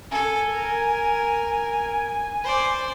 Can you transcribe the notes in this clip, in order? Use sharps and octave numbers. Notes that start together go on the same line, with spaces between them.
A4 G#5
A#4
C5 D5